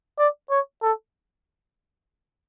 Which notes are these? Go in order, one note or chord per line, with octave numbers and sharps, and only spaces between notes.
D5
C#5
A4